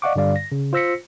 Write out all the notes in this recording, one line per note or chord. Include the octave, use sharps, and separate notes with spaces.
D5 D#5 F5 F#5 C#6 D6
G2 D3 G3 D5 F5
A#6
C#3
F4 C5 E6 A#6 B6 C#7